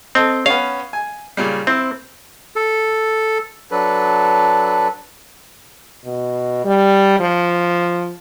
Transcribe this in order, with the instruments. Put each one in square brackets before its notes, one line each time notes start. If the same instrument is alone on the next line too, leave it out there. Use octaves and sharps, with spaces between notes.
[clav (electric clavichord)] C4 [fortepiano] A4 D#5
[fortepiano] B3 C#4 [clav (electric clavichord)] F5
[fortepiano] G#5
A#2 C#3 G3
[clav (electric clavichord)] C4 [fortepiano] E4 C5
[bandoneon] A4
[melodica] F#3 D4 A4 B4
[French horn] B2
G3
F3